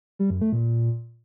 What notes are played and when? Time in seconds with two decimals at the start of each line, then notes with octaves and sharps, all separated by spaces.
0.19 G3
0.30 F#2
0.41 A3
0.53 A#2